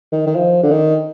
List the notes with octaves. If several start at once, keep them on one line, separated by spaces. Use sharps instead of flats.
D#3
D#3
F3
D3
D#3